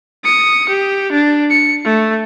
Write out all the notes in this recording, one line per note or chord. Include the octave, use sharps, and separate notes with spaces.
D#6 C#7
G4
D4
C#7
A3